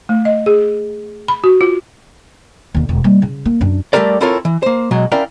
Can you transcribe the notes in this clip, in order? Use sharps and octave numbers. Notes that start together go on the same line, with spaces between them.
A3
D#5
G#4
B5
F#4
F4
D#2 D3
E1
G3 A#3
C#3
A#3
F#2 D4
G3 A3 G4 A4 A#4 D5
C4 E4 F4 A4 A#4 C#5
E3
A#3 C5
B2 F#3 G#3
C#4 E4 A#4 D5 F5 G5